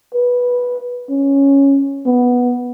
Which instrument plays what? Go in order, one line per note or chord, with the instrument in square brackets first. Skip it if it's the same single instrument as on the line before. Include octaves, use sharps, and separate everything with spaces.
[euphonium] B4
C#4
B3